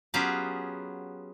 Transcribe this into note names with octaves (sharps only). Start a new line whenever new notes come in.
F#3 B3 C#4 F4 G4 G#4